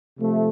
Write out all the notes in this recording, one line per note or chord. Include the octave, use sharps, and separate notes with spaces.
C3 F3 A3